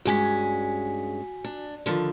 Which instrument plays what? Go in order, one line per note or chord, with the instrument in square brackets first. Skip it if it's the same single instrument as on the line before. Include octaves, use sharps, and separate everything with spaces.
[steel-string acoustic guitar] G2 G#3 C#4 [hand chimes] F#4 G#5 B6
[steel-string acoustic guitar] D4
D3 D#3 F3